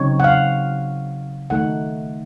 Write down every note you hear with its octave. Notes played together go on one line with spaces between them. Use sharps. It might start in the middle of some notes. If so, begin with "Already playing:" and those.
Already playing: C#3 F#3 C4 D#4 C#5
F#5
F5
D#3 A3 D#4 F#5